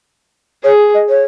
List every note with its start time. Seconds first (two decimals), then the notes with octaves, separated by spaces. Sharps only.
0.64 G#4 C#5
0.94 D#5
1.09 C#5